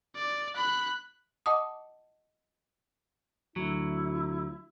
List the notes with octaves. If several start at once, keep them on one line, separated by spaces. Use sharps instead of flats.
D5
B5 F#6
D#5 F#5 A5 D6 D#6
D2 F#3 E4